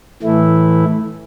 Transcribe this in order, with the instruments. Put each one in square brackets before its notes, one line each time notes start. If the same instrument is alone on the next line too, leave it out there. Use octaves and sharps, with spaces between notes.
[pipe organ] A2 E3 A3 E4